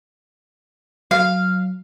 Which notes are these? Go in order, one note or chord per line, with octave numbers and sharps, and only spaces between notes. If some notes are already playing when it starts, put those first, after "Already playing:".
F#3 F5